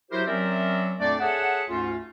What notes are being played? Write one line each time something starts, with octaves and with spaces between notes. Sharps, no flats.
F#3 E4 F#4 G4 A#4 C5
F#3 C4 C#4 A#4 D5 E5
F2 A#2 A3 D4 D5
G#4 A4 C#5 E5 F#5
D2 G#2 A3 C#4 F4